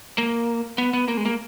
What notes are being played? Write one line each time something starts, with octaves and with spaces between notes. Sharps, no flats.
A#3
B3
B3
A#3
G#3
A#3